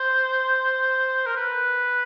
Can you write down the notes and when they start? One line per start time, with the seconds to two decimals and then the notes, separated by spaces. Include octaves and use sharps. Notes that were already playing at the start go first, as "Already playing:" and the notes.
Already playing: C5
1.26 A#4
1.36 B4